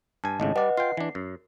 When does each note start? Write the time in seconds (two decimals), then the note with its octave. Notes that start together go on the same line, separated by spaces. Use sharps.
0.24 G2 G#5 A5
0.40 G#1 A2 C#3 D#5
0.56 G3 B4 D5 D#5 F#5
0.77 F4 G5 C7
0.97 E3 D4
1.15 F#2